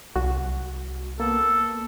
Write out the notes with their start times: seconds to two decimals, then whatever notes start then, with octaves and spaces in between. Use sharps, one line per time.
0.16 C2 F#4
1.20 A#3 B3 A4